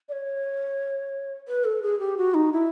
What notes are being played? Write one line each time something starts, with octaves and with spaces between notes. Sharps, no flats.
D5
C#5
B4
A4
G#4
G4
F#4
D#4
E4